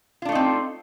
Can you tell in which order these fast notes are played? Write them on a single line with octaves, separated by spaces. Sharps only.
F4 D4 A3 D#4 C4